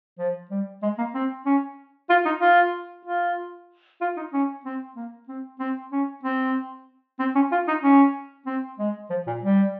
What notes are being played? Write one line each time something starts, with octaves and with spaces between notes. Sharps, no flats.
F3
G3
G#3
A#3
C4
C#4
F4
D#4
F4
F4
F4
D#4
C#4
C4
A#3
C4
C4
C#4
C4
C4
C#4
F4
D#4
C#4
C4
G#3
F3
A#2
G3